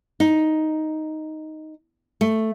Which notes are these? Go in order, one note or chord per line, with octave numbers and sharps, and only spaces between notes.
D#4
A3